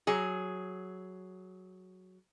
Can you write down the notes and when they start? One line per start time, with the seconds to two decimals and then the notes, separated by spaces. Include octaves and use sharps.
0.07 F#3 G#4